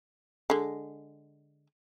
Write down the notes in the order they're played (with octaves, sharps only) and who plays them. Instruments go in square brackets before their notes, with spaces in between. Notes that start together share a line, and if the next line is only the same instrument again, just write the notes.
[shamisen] D3 G#3